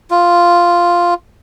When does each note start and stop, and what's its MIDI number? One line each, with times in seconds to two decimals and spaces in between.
0.11 1.14 65